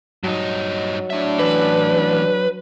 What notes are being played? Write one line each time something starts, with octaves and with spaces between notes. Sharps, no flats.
G2 F#3 D#4
A2 D4 E5
A2 E3 B4